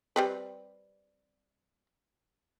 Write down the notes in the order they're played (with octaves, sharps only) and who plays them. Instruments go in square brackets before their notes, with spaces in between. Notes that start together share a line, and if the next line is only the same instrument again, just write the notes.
[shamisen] G3 C4 B4